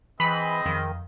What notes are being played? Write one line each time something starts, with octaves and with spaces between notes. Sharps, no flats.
E3 C4 G#4 D#5 B5
F2 D#3